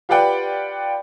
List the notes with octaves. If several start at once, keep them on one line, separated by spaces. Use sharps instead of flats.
F4 G4 B4 D5 F#5 G5